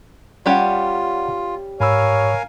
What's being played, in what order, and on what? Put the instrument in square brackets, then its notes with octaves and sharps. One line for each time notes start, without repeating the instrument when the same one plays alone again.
[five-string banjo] G3 C#4 G4 [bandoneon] F4 [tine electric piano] D5 F#5
[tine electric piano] G#2 B5 E6 [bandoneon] A#4 F5 G#5 [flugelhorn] C#5